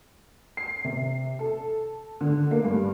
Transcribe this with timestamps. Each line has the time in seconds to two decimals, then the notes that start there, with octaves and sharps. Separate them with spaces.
0.57 C7
0.84 C3
1.39 A4
2.21 D3
2.51 A#3
2.64 G2